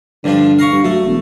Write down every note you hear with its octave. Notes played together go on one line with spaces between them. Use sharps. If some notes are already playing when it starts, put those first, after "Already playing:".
G2 D3 F3 D4
F5 A#5 C#6
G2
F#3 A3
E1